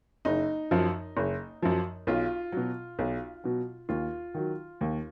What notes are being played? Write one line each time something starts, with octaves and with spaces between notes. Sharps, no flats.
F#1 D#4
F#2 F3
F#1
F#2 F3
B1 F4
B2 F#3
B1
B2 F#3
D#2 F4
D#3 F#3
D#2